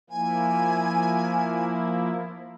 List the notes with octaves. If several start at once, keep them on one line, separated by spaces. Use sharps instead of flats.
F3 A#3 E4 G#5